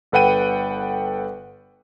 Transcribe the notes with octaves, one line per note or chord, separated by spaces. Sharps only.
G1 A4 B4 F#5 G5 D#7